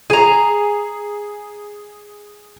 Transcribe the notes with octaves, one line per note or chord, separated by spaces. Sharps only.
G#4 G#5 A#5